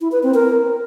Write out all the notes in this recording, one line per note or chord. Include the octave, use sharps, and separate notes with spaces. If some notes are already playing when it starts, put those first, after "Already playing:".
E4
B4
C4
A#4